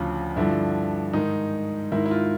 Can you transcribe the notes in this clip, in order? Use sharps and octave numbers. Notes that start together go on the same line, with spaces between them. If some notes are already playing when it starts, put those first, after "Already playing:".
Already playing: D2 C#3 F3
G2 D3 F3 E4
G#2 D#3 D#4
G#2 D#3 E4
E4
F4